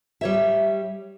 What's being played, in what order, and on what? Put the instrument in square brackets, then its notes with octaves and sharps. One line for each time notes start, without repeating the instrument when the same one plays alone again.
[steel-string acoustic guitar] G3 C#5 E5